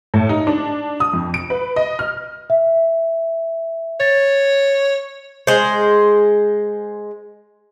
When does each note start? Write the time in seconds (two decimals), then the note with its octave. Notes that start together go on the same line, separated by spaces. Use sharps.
0.14 A2
0.29 D#4
0.47 D4
1.00 D#6
1.13 F2
1.34 D7
1.50 B4
1.76 D#5
1.99 F6
2.50 E5
4.00 C#5 A6
5.47 G#3 C5